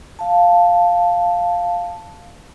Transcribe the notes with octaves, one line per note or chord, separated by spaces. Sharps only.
F5 A5